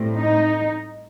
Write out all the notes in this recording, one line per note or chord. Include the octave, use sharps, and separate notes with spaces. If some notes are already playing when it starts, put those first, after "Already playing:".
Already playing: A2 G3 C4
D#4